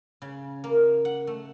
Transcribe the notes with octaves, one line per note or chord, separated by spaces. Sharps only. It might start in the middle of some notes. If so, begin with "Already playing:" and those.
C#3
A#3
F#5
A3